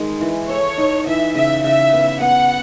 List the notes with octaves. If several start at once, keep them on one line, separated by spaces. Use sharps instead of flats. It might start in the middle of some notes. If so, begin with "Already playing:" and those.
Already playing: D#3 G#3 D#4
E3
A4 C#5
D#4
E3 E5
C#3 E5
C#3 E5
B3
B3 F#5